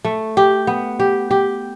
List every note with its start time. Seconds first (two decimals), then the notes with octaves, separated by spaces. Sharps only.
0.05 A3
0.37 G4
0.67 B3
1.00 G4
1.31 G4